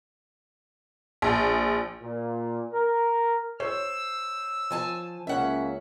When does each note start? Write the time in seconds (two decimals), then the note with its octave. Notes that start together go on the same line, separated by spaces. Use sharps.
1.22 A#1
2.02 A#2
2.71 A#4
3.60 C5 C#5 E6
4.71 F3 G#5 A5
5.27 C#2 A#3 C#4 E5 F#5